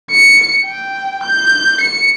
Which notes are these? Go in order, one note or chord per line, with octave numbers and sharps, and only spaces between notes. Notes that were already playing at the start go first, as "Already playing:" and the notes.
C#7
G5
G6
C#7